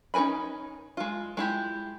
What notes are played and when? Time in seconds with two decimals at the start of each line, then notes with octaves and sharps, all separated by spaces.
0.14 C#4 D#4 A#4 G#5 B5
0.97 G#3 F4
1.37 G#3 E4 G4